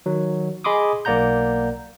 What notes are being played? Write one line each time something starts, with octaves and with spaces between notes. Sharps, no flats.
D#3 F#3
G#4 D#5 B5 C6 D6 D#6
B1 A#3 D5 F#5 A#5 G6